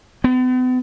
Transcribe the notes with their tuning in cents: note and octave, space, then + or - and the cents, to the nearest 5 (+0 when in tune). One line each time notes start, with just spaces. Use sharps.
B3 +40